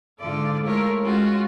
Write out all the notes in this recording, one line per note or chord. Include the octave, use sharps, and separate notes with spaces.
G#2 D3 F4 A4 D5
G#3 A3 E4 F4 A#4 C#5
G#3 C#4 F4 F#4